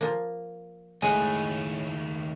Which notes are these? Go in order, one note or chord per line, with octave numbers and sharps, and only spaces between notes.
F3 A#3
D#2 A2 G#3 A3 F#5 G#5